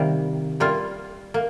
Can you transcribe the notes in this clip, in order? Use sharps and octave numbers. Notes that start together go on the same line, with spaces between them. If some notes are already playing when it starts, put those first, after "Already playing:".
Already playing: C3 D#3 G3 A#3
G3 A#3 F4
A#3